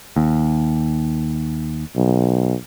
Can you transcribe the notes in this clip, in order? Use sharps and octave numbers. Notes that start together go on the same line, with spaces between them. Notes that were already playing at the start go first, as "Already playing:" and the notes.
D#2
B1